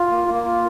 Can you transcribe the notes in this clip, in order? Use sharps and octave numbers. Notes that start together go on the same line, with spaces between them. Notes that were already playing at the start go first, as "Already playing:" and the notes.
Already playing: F4
A#3
A#3
F4